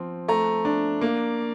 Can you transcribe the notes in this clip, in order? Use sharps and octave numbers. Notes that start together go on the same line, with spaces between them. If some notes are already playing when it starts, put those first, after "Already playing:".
Already playing: F3 C4
A3 A#5
D4
A#3